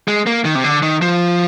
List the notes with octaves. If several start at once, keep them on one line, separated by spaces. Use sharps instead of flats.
G#3
A#3
D#3
C3
D3
D#3
F3